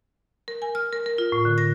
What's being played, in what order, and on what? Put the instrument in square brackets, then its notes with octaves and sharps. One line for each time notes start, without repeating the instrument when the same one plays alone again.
[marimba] A#4
G#5
F6
A#4
A#4
F4
A2
D3
A#6